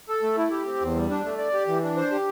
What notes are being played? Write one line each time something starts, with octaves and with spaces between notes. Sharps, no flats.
A4
A3
E4
G4
C4
E2
G3
D4
A3
D5
G4
E3
D4
C5
G4